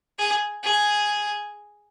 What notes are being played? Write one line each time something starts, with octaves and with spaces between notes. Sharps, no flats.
G#4
G#4